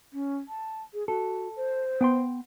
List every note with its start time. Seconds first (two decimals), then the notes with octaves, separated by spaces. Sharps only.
0.13 C#4
0.48 A5
0.94 G#4
1.08 F#4 A4
1.56 C5
2.01 B3 G5 C6